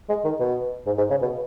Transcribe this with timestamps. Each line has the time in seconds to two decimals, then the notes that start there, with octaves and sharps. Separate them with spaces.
0.09 G#3
0.24 D#3
0.40 B2
0.86 G#2
0.98 G#2
1.10 C#3
1.22 B2